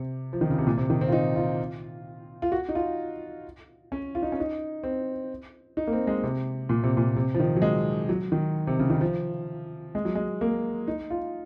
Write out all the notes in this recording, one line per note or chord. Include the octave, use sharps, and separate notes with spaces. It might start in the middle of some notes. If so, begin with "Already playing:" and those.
Already playing: C3
F3
D#3
C#3
C3
A#2
C3
D#3
C4
F4
D#4
F4
F4
F#4
D#4
F4
C#4
F4
D#4
C#4
D#4
C4
D#4
A#3
C4
G#3
C3
A#2
C3
A#2
C3
F3
D#3
F#3
G#3
F#3
D#3
C3
C#3
D#3
F3
G#3
F#3
G#3
A#3
D#4
F4